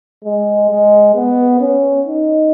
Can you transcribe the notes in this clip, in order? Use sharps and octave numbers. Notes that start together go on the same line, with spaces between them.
G#3
G#3
B3
C#4
D#4